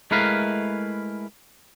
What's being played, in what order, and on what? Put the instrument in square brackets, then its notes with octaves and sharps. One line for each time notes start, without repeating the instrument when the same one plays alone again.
[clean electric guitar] G#3 A3 E4 A#4 B4 F5